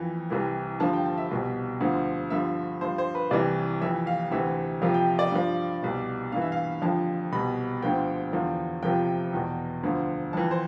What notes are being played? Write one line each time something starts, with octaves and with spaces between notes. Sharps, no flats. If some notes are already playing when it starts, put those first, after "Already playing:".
Already playing: F2 E3
C2 C3 E3
G2 D3 F3 A5
G5
A5
E5
C2 B2
D2 D3 F3
G2 D3 F3 E5
G2 F3 C5
C5
B4
C2 C3 E3 D5
F2 E3 E5
F5
D2 C3 E3 E5
F2 C3 F3 F5
G5
D5
G2 F3
C2 B2
G2 E3 F5
E5
F5
F2 D3 F3 A5
C2 B2 B5
D2 D3 F3 G5
E2 D3 F3
F2 C3 F3 G5
E2 B2
D2 D3 F3
F2 E3 A5
C5